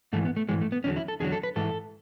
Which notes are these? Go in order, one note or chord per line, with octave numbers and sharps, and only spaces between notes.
G#2 E3 A3
B3
A3
G#2 E3 G#3
A3
B3
E2 D3 F#3 C#4
E4
A4
E2 D3 F#3 G#4
A4
B4
G#2 E3 A4